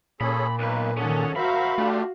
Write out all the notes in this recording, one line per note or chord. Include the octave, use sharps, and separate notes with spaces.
A#2 C#4 G#4 A4 B5
B1 A#3 B4
D#3 C#4 G#4 A4 F#5
F#4 A#4 C5 E5 F5 B5
A3 D4 F4 G4